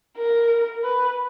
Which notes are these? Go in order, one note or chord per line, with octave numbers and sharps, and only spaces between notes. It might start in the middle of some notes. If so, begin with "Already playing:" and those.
A#4
B4